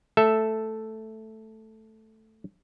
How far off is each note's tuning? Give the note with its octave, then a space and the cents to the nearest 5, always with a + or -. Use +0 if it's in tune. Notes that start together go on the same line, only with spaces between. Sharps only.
A3 +0 A4 +0 E5 +0